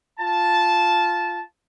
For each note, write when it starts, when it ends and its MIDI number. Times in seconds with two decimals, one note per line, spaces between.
0.20 1.41 65
0.20 1.41 81